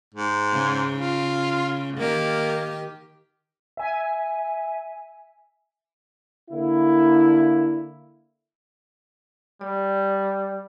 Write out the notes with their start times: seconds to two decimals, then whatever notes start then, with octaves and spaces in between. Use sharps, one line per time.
0.14 G#2
0.52 C#3
0.99 F4
1.98 D#3 A#3 G4
3.77 E5 G#5
6.51 D3 A#3 E4
9.61 G3 D5